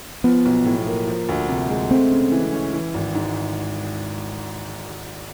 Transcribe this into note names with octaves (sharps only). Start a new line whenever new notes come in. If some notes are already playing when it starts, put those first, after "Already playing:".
F3 B3
B1
A2
A#3
F3
D2
C3
G#3
A3 C4
C#3
E3
C#4
E3
G#1
G#2